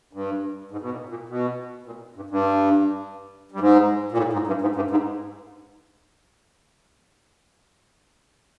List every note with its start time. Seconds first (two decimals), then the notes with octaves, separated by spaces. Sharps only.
0.13 G2
0.71 G#2
0.81 B2
0.91 A#2
1.09 A#2
1.29 B2
1.86 A#2
2.16 G2
2.30 G2
3.52 G2
3.60 G#2
4.12 A#2
4.17 A2
4.33 G#2
4.47 G2
4.61 G#2
4.76 G2
4.91 G#2